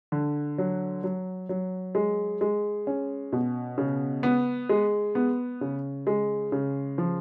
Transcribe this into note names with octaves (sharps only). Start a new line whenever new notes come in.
D3
F#3
F#3
F#3
G#3
G#3
C#4
B2
C#3
B3
G#3
B3
C#3
G#3
C#3
F3